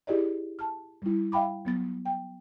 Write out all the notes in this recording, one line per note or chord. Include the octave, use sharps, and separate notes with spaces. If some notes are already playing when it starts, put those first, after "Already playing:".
E4 G4 G#4 D5 D#5
A5 F6
G3 E4
E5 F5 G5 B5 D6
F#3 B3 A6
G5